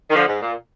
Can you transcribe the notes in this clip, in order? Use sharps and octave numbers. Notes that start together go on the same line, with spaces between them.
D#3
D3 F3
G#2
A#2